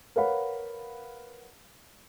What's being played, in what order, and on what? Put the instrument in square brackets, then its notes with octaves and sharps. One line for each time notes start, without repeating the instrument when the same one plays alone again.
[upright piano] A#4 B4 C#5 F5 F#5 B5